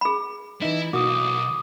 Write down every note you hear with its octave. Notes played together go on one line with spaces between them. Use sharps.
G#4 B5
E3 D#4 E4
B1 A#3 F#4 D6 D#6